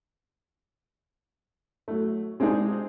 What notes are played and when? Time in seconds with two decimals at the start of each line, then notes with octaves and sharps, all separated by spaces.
1.88 F#3 A3
2.40 G#3 C4 D4 D#4 G#4